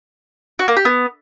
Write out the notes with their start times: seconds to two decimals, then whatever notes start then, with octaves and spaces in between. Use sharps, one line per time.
0.59 F#4
0.68 A#3
0.77 G4
0.85 B3